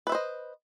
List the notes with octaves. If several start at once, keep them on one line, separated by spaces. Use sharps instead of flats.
B4 C5 D#5 E5